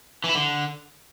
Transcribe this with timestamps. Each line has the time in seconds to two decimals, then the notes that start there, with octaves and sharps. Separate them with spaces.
0.24 E3
0.29 E4
0.35 D3